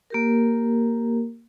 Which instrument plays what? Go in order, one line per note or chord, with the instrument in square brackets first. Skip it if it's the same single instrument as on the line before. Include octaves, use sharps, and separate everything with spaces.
[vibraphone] A#3 G4 A#4